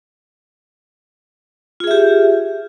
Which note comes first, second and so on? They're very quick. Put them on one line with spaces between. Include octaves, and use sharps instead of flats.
F4 G#4 E5 G4